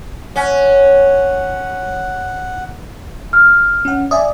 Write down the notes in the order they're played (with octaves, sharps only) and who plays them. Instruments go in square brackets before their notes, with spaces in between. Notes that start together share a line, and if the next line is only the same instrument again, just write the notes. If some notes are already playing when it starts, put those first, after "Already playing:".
[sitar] C#4 [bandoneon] F#5
[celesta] F6
[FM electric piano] C#4 F#5
[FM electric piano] D5 E5 G#5 [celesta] D#6